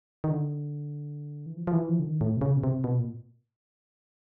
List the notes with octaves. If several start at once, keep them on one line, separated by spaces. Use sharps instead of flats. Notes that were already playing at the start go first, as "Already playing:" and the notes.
D#3
D3
E3
F3
F3
E3
F3
D3
D#3
A2
C3
C#3
B2
C3
B2
A#2